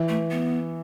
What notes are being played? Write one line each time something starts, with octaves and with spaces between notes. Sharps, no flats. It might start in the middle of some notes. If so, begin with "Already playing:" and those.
Already playing: E3
A3
B3